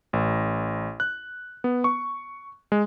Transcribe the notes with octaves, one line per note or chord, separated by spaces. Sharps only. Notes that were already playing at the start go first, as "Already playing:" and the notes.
A1
F#6
B3
C#6
G#3